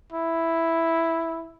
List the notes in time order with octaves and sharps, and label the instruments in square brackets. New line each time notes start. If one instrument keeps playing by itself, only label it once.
[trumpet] E4